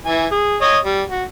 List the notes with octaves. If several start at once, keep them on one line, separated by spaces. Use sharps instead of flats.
E3 G#5
G#4
C#5 D#5 D#6
G3
F#4